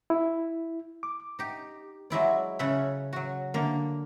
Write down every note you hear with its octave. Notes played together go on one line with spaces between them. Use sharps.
E4
D6
D#4 G4
F#3 G#3 E4 D5
C#3 C#4 A4 E5 F#5 B5
F#3 F#4
D3 A#3